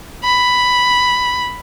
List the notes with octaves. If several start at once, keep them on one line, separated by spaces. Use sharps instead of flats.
B5